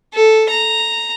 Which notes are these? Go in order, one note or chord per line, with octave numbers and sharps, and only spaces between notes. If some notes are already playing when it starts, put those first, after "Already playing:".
A4
A#5